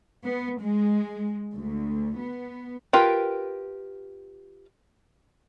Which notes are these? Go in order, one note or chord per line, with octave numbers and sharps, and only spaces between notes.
B3
G#3
D2
B3
F4 G4 A#4 B4 G5